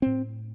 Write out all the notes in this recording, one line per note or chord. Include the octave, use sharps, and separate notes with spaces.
A2 C4